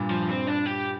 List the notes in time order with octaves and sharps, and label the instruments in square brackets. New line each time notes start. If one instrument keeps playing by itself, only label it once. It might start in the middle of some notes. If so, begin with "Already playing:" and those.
Already playing: [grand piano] G2 A#2
[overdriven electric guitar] F3
C4
D4
G4